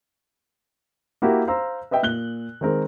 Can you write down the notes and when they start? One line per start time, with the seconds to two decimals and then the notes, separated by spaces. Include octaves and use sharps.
1.22 A#3 E4 F#4 G4 A#4
1.48 C5 F5 A#5 E6
1.91 B4 D#5 E5 G5
2.03 A#2 F#6 G7
2.61 D#3 G#3 C4 A#4